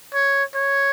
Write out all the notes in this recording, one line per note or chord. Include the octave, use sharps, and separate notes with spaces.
C#5
C#5